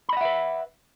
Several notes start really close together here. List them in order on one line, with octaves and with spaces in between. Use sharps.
B5 D#5 F#5 E5 B4